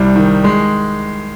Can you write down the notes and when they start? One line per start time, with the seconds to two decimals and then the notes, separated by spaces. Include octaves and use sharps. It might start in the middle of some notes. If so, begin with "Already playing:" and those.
Already playing: C2 G3
0.16 D#3
0.44 G#3